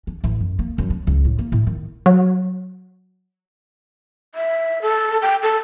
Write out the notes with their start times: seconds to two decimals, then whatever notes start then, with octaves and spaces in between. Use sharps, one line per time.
0.07 D4
0.24 A1
0.40 F#2
0.59 A#3
0.78 F#2
0.90 D4
1.07 C#2
1.25 A2
1.39 A#3
1.52 A2
1.67 D#3
2.06 F#3
4.35 E5
4.82 A4
5.22 G5
5.43 A4